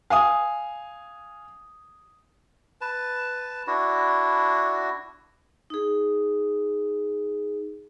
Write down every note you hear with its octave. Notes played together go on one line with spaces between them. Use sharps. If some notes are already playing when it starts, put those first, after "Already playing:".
F5 G#5 D#6
B4 A5
D4 E4 F#4
D#4 G#4